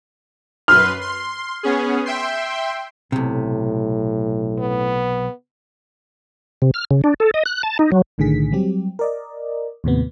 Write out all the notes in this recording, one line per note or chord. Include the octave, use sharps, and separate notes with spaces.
F#2 B4 C6 F6
C6
B3 C#4 G#4
E5 G5 C6
B1 A2 C3
B3
C3
F6
C#3
D4
A4
D#5
F#6
A5
D#4
F#3
B1 A2 D3 D#3 G#4 B6
F#3 G3 C4 G4
A#4 D5 D#5
D#2 A2 C3 B3